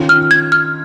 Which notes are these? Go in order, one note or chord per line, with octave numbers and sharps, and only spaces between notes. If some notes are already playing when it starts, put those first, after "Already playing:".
Already playing: D#3 C#4 F4
F6
G#6
F6